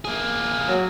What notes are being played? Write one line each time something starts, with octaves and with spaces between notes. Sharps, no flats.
A#3 G#4
F#3